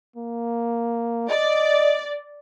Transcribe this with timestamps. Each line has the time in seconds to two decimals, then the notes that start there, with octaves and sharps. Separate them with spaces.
0.16 A#3
1.30 D5 D#5